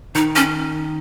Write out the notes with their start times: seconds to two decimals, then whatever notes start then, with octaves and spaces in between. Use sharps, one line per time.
0.15 D#3 D#4
0.36 C#4